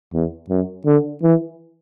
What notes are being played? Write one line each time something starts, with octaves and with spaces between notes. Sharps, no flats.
E2
F#2
D3
E3